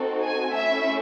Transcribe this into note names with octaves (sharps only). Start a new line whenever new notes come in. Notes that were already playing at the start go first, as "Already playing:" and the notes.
Already playing: C4 D#4 F#4 A4
G#5
A3 C#4 E4 E5